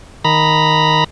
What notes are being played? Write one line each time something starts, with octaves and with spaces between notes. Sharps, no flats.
D#3 A#5 B5